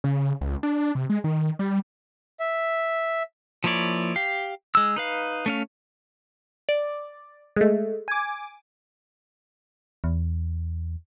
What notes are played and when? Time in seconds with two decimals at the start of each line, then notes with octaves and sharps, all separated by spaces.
0.04 C#3
0.41 C#2
0.63 D4
0.95 C3
1.10 G#3
1.24 D#3
1.59 G3
2.40 E5
3.64 F3 A#3 E4 C#5 D5
4.16 G4 F5
4.75 G#3 E6
4.96 D#4 B4 F5
5.46 A3 C#4 F5
6.69 D5
7.56 G#3 A3
8.08 G#5 D6
10.04 E2